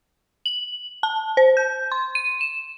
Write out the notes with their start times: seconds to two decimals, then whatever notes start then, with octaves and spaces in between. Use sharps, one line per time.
0.46 F#7
1.03 A5
1.37 C5
1.57 G6
1.92 C6
2.15 D#7
2.41 E7